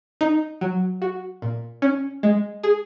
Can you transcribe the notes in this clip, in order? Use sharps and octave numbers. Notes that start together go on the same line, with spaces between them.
D#4
F#3
F#4
A#2
C#4
G#3
G#4